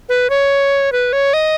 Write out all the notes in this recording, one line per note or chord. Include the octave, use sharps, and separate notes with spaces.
B4
C#5
B4
C#5
D#5